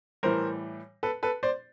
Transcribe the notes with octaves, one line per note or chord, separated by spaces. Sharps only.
A2 E3 G3 A#4 C5
A4 B4
A4 B4
C5 D5